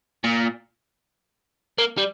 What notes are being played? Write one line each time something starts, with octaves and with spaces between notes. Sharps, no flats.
A#2
A#3
G3